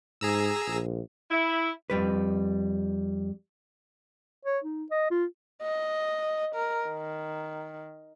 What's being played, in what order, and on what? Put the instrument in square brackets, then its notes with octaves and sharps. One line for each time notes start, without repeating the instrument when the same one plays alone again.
[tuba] G#2 [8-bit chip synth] G#4 A#5 E6
[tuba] A#1
[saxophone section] E4
[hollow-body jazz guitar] F2 G3 B4
[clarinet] C#5
D#4
D#5
F4
[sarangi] D#5
A#4
D#3